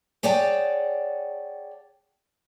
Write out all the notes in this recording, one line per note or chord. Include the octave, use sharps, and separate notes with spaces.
G#4 C#5 D5 F#5 G5 A5